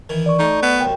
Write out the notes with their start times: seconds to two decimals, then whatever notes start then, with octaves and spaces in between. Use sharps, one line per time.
0.09 D#3 E3 E4
0.26 D5 C#6
0.39 A3 D#4
0.62 B3
0.81 C2 F#2 G5